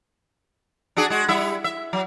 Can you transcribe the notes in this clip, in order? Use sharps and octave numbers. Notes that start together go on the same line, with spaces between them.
D4 F#4 G#4
G#3 F#4
G3 E4 E5
E5
F#3